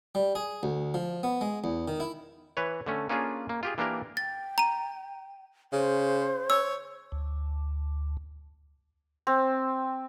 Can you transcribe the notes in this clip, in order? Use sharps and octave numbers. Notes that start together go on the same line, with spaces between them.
G3
G#4
D2
F3
B3
G#3
E2
D#3
E4
E3 B4 C#5
D3 A3 C#4
A#3 C#4 D4 F4 G#4
A#3
F4 G4 G#4
E3 A#3 D4 G4 A#4
G5 A6
A#5 D#7
C#3 C5
C#5 E6
D2
C4